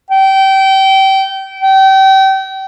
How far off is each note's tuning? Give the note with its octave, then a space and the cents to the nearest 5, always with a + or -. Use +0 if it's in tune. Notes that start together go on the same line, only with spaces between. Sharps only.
G5 -25
G5 -30